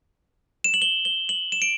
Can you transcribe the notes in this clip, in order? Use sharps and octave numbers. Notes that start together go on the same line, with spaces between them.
E7
F#7
G7
G7
F#7
E7
D7